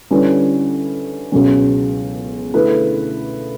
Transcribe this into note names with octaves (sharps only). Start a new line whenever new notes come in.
D3 G3 C#4 E4 B4
C#2 B2 F#3 C#4
D3 A3 E4 B4